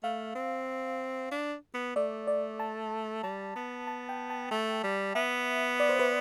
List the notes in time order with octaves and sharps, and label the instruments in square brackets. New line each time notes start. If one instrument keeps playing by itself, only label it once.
[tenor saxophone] A3 [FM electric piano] F5
[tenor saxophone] C4
D4
B3
[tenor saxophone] A3 [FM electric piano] D5
[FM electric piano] D5
A5
[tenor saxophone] G3 [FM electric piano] A5
[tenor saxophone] B3 [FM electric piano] A5
[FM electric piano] A5
G5
A5
[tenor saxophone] A3 [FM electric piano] A5
[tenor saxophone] G3
[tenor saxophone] B3 [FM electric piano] E5
[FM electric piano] D5
C5
B4